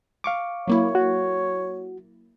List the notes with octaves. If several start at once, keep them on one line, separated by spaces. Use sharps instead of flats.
F5 C#6 D6
F#3 A#3 E4 C#5
F#4